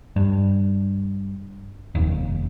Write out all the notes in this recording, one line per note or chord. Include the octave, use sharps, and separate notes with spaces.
G2
F1 D#2